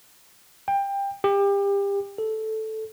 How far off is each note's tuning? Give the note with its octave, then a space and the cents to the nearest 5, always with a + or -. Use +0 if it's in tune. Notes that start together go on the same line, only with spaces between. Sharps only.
G5 +20
G4 +30
A4 -5